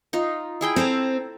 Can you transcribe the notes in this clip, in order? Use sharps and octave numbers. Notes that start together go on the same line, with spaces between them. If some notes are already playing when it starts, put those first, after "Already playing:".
D#4 F4
E4 G#4 G5
C4 A4 C5 A#5